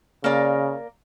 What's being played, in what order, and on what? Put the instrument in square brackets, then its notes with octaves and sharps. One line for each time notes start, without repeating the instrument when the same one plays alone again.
[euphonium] C#3 [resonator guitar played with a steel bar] A#3 A#4 D5